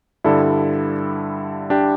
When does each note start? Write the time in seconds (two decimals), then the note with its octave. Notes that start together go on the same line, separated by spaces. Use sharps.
0.24 G2 D3 G3 E4 A4
1.70 D4 G4